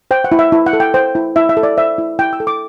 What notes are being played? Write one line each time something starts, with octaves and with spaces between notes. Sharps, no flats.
C5 G5
F#5
E4
E5
E4
F#5
A4
G5
C5 G5
E4
E4 E5
E5
A4
D5
C5 E5
E4
E4 G5
E6
A4
D6